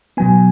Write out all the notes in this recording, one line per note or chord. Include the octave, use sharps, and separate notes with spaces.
B2 F#3 B3 G#5